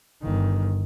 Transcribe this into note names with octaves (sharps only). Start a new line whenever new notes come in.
G1 D#3